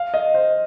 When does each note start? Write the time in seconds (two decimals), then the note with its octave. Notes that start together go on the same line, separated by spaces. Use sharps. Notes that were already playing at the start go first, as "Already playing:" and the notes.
Already playing: F5
0.14 D#5
0.34 C5